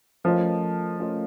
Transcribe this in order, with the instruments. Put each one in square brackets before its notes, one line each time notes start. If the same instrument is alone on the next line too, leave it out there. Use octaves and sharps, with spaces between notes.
[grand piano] F3 [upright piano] A3 C#4 F4 A#4 D#5
[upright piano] A3 C#4 F4 A#4 D#5